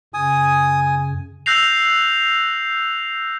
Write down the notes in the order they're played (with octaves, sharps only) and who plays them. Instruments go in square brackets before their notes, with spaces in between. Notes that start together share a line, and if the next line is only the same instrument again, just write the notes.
[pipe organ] F#2 C#3 [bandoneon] G#5 [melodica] D#6
[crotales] E6 F#6 G6 A#6 C7 F7